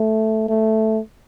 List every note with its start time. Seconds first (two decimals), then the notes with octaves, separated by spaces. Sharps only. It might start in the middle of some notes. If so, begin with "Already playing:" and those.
Already playing: A3
0.49 A3